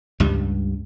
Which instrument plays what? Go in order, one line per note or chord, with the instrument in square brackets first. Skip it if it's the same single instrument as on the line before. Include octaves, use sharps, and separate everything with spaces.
[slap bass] C#2 G2 G3